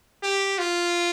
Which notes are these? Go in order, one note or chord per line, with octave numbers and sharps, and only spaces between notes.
G4
F4